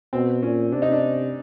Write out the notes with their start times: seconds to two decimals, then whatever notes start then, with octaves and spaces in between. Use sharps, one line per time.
0.13 B2 C4
0.43 A#2 C#4
0.72 C3 D4
0.82 D#4
0.92 D4